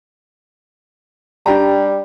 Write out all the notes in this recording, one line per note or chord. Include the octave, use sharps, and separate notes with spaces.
G3 D4 G4 A#5